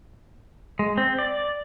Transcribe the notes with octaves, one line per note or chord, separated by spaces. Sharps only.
G#3
C4
D5